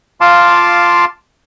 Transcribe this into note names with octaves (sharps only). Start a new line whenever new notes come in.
F4 F5 A5 C6 D6